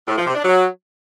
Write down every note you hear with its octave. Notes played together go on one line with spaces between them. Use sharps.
A2
F3
C3
D4
F#3